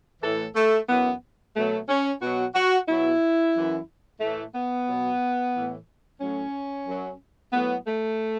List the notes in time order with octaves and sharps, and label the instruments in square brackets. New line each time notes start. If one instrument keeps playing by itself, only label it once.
[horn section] A2 E3 A4
A3
F#2 E3 B3
B2 F#3 A3
C#4
B2 F#3 F#4
F#4
B2 F#3 E4
F#2 E3
A2 E3 A3
B3
B2 F#3
A2 E3
A2 F#3 C#4
F#2 F#3
A2 F#3 B3
A3